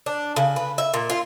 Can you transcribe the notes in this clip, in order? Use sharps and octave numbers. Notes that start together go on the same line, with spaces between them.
D4
C#3
B4
E5
A#2
F4